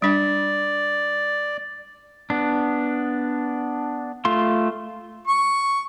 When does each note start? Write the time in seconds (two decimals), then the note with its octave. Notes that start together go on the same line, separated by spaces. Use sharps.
0.02 G3 D4 D5
2.30 B3 D4
4.25 A3 F4 C6
5.27 C#6